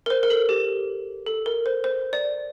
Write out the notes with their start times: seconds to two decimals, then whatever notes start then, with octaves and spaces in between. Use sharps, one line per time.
0.06 A#4
0.10 C5
0.23 A#4
0.30 A4
0.49 G4
1.26 A4
1.46 A#4
1.66 C5
1.84 C5
2.13 D5